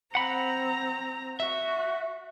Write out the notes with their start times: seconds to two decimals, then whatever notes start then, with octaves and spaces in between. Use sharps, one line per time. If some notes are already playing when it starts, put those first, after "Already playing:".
0.15 C4 F#5 A#5 B5
1.40 F#4 E5